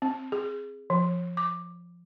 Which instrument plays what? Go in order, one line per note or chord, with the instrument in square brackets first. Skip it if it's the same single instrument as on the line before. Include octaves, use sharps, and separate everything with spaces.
[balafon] C4
G#4
F3
D6